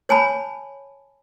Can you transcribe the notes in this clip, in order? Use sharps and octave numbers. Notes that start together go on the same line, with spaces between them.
C#5 G#5 A5 B5